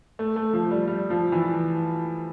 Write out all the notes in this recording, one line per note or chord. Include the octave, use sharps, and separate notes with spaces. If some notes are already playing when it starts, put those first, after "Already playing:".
A3
A3
F3
G3
G3
F3
E3